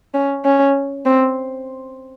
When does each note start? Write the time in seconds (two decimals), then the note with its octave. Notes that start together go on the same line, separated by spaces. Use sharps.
0.14 C#4
0.45 C#4
1.05 C4